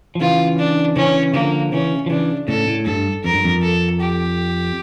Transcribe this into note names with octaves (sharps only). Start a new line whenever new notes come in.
F3
C#3 E3 F4
D4
C#3 E3 C#4
D3 F3 A#3
C#3 E3 C#4
F3
C#3 E3 D4
A2 C#3 A4
A2
G2 A4
F2 A#4
G2
F2
A4
G4